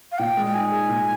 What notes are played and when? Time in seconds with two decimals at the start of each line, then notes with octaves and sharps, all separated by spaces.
0.12 F5
0.19 A#2 G5
0.37 G#3
0.46 G5
0.54 D#4 G#5
0.72 G#4
0.90 A#2